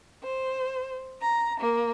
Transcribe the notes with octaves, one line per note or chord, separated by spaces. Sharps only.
C5
A#5
A#3